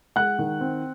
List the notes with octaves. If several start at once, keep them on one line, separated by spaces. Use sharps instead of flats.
G#3 F#5 F#6
D#3
C4